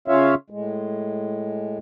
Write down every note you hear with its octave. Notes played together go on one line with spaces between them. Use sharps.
C#3 C#4 F4 C#5 E5 F5
A2 G#3